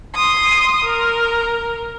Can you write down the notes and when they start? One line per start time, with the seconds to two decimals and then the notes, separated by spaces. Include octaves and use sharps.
0.15 C6 D#6
0.84 A#4